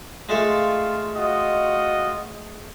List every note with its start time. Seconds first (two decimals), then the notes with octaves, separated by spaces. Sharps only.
0.29 G#3 A3 F4 A4
1.16 F4 F#4 D#5